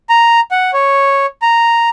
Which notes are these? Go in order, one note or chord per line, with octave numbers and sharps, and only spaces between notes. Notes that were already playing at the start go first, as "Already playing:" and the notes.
A#5
F#5
C#5
A#5